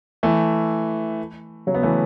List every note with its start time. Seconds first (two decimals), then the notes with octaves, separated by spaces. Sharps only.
0.23 E3 A3
1.67 C#3 F#3
1.75 B3
1.83 E3 A3